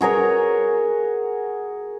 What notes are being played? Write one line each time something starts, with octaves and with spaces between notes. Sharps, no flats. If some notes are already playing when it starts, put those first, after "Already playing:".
F#4 G#4 A#4 C#5